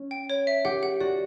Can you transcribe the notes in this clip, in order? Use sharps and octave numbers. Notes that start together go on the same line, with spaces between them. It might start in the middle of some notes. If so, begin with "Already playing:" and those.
Already playing: C#4
G5
C#5
E5
G4 F#5
F#5
F#4 D5